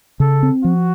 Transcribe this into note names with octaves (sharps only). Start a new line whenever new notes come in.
C#3 A4
C4
F3 F#4